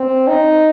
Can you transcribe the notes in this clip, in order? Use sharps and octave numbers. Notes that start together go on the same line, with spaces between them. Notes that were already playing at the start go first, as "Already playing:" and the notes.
Already playing: C4
D#4